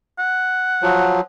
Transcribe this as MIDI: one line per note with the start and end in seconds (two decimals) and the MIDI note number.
0.19 1.25 78
0.82 1.21 53
0.82 1.21 54